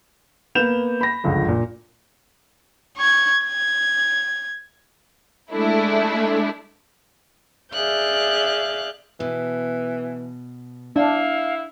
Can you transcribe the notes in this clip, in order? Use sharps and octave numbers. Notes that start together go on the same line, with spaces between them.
A#3 B3 G6 E7 F7
B5 A#6
G1 C#2 F3
A#2
C#6 G#6
G#6
G#3 A3 D4 E4
G#4 D5 E5 F5 F#6 G6
B2 E3
D4 E4 F5